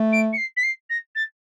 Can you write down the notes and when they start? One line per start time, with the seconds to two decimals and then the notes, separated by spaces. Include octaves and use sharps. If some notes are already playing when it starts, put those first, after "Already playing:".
Already playing: A3
0.12 D7
0.33 C#7
0.37 C7
0.57 B6
0.63 C7
0.90 A#6
1.15 A6